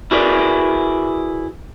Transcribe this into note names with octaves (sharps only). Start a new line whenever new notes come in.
E4 F#4 G#4 A#4 B4 D5